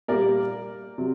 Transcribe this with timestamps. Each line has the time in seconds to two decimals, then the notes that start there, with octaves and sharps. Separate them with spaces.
0.08 A#2 G3 A#3 A#4 D5
0.98 C3 F#3